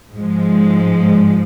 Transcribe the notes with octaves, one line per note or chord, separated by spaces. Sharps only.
G#2 F3 G#3